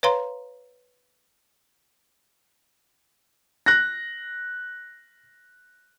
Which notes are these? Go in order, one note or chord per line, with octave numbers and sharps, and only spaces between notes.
B4 C#5 F5 A#5 C6
F#6 A#6